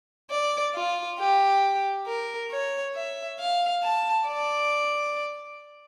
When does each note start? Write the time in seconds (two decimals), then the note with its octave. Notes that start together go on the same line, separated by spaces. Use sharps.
0.30 D5
0.75 F4
1.19 G4
2.07 A#4
2.50 C#5
2.95 E5
3.39 F5
3.83 A5
4.27 D5